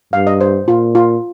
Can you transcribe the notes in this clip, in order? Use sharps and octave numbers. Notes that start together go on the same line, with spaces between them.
G2 F5
D#5
C5
A#2 F4
F4